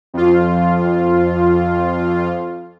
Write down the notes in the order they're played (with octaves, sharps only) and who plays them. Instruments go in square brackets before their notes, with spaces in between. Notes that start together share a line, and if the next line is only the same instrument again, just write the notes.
[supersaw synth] F2 F4